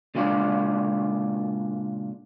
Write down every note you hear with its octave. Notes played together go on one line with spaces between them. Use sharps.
A#2 C#3 G#3 D4 F4